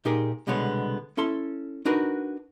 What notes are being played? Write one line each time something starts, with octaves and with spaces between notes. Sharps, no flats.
A#2 D#4 G4 G#4 A#4 F5
C2 B2 D3 G#3 B3 C#5
C#4 E4 A4 C6
D4 D#4 F#4 A#4 B4